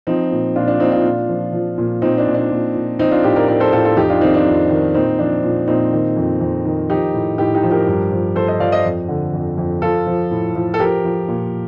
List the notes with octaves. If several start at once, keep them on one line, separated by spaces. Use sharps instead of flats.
F3 C4 D#4
A#2
A#2 D4 F4
D4
A#2 C4 D#4
D4 F4
A#2
F3
F3
A#2
A#2 C4 D#4
D4
A#2
D4
A#2
A#2
F3 C4 D#4
D4 F4
A2 D#4 G4
A#4 D5
A2 A#4 D5
A4 C5
A2 F4 A4
F4 A4
F2 D#4 G4
D4 F4
D#3 C4 D#4
D4
F2
D#3
A#2 C4 D#4
F3 D4
A#2
A#2 C4 D#4
D#3
F2
F2
D#3
F3 D#4 G4
A2
A2 D#4 G4
D#4 G4
F3
G4 A#4
G2
F3
F3 A4 C5
C5 D#5
F3 D5 F5
C5 D#5
F2
D3
F2
F2
F3 F4 A4
F3
A2
F3
A4
F3 G4 A#4
F3
A#2